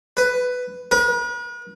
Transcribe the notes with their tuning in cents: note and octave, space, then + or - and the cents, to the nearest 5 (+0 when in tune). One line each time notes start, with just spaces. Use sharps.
B4 +10
B4 -45